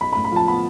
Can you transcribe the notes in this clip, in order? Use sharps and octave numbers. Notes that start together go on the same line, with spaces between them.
B1 B5
B5
A2
B5
F3 A5
B3 B5